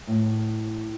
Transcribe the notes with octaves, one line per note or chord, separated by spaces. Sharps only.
A2